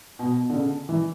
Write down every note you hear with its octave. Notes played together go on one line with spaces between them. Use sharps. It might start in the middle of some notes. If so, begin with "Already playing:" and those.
B2
D3
C#3
E3